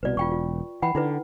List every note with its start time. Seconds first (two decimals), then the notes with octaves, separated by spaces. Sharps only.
0.03 C2 B2 B4 D5
0.17 E1 F4 G5 C#6
0.31 F4
0.82 E3 F#5 G5 B5
0.95 D3 D#4 E4 B4